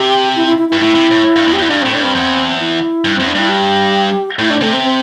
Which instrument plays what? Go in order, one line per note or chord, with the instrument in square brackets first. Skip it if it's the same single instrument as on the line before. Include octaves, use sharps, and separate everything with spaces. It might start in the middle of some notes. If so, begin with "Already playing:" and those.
Already playing: [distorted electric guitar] C3 [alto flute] G4
[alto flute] E4
E4
E4
E4
[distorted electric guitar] G2
[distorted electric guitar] A2 [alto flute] E4
[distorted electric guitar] C3
A2
G2
E2
[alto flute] G4
[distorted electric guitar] E2
[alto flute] E4
[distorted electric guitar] G2 [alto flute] D4
[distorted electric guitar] A2 [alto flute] C4
[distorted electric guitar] A2 [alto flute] D4
[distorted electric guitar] G2 [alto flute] C4
[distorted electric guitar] E2
[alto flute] E4
[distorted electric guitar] G2
[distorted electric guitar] E2 [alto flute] C4
[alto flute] D4
[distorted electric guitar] G2 [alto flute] E4
[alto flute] G4
[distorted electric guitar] A2 [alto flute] E4
[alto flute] D4
[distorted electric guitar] C3 [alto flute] A3
[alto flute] C4
C4